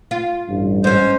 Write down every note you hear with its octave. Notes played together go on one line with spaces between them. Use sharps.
F4
A1 G2
G#2 C#4 C5